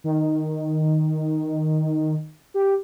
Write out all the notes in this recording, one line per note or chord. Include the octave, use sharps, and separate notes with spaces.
D#3
G4